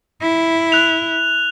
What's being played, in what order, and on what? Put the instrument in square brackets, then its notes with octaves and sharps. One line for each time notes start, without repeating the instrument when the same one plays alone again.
[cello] E4
[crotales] F#6 F7